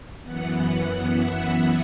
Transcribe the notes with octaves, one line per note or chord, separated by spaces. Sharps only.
F#2 E3 B3 F#5
E5